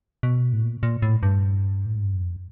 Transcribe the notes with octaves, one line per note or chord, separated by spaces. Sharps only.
B2
A2
A#2
A#2
A2
G2
A2
G#2
G2
F#2
F2